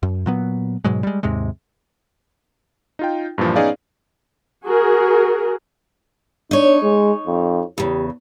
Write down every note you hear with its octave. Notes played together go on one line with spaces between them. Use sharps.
F#2
A#2 F#3 B3
G#2 B2 F#3 G#3
G3 G#3
D#2 G#2 C3 G#3
D#4 F4 G5
G2 A#2 E3 F3
B3 C#4 D#4 G#4 D5 F5
F#4 G#4 A#4
D4 D#4 C#5
G#3
F2
E2 C#3 G4